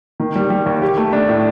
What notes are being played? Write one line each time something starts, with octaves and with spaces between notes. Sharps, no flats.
D#3
G3
G3
D#2
G4
A3
D4
A2